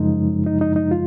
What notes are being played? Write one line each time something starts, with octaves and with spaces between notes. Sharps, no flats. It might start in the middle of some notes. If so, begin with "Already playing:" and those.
Already playing: F#2 C#3 F3 G#3 D#4
D#4
D#4
D#4
F4